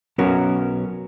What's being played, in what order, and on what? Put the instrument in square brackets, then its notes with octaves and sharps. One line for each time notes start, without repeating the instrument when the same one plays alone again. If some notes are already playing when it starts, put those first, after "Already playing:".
[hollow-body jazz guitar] B1 F#3 B3 C#4 F#4 A#4